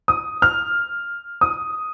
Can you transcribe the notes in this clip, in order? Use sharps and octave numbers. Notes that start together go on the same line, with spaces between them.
D#6
F6
D#6